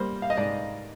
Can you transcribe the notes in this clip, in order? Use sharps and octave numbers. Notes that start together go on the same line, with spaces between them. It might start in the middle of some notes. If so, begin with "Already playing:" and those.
Already playing: G3 A#3 C5
F5
D#5
G#2 D5